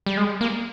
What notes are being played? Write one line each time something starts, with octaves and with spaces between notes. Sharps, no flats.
G3
G#3
A#3